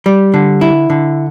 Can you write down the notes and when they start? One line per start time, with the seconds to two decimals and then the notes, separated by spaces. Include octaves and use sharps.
0.06 G3
0.34 D3
0.61 E4
0.90 D3